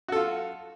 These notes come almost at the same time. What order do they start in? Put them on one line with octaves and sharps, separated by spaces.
F#4 A4 F4